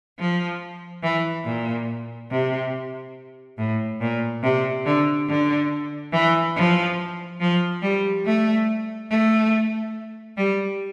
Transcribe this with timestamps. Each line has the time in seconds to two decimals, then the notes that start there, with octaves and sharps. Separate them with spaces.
0.19 F3
1.03 E3
1.45 A#2
2.31 C3
3.58 A2
4.01 A#2
4.43 C3
4.85 D3
5.28 D3
6.13 E3
6.56 F3
7.40 F3
7.82 G3
8.26 A3
9.11 A3
10.37 G3